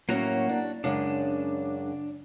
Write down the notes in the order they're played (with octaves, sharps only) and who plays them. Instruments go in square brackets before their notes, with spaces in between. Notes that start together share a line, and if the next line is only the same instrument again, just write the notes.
[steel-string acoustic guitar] A2 F#3 C#4 [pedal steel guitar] A#3 F#4 A#5
[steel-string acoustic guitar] D4
[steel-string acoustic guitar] F#2 C#3 G#3 [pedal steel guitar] D4